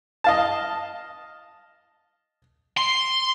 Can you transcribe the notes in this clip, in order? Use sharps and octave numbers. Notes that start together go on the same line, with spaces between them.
D#5 F5 A5
C6